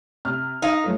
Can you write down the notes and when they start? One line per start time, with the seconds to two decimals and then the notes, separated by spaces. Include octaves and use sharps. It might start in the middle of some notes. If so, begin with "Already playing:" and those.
0.25 C3 F6
0.62 D#4 F5
0.84 F3 F#3 A3